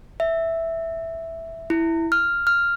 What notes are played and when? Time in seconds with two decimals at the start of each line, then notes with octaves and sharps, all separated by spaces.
0.20 E5
1.70 E4
2.12 F6
2.47 F6